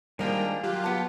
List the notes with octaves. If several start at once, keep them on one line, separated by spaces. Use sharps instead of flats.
D#3 F3 G3 G#3 A#3 D4 A#4 G5
F#3 F4 G4
B3 A5